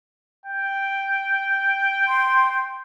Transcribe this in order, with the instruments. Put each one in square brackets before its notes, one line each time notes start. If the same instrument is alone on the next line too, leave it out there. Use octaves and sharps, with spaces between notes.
[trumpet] G5
[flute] C6